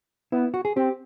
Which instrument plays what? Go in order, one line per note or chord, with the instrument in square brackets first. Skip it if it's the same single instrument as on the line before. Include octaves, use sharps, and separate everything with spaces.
[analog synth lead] B3 [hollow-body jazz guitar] E4
[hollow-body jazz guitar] F#4
G#4
[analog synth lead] C4 [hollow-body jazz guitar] G4